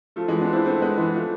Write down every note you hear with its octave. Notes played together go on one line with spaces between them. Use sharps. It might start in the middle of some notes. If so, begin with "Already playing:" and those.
F3 A3
E3 G#3
B3 D4
C4 E4
A3 C4
G#3 B3
E3 G#3
F3 A3